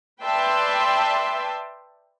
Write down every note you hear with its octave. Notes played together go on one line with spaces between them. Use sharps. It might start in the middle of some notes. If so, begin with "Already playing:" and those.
B4 D5 E5 G5 A5 C6